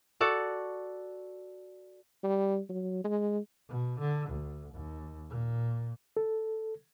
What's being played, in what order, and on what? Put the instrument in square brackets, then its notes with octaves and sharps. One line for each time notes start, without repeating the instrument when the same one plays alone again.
[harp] F#4 A4 D5
[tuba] G3
F#3
G#3
[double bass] B2
D3
D2
D#2
A#2
[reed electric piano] A4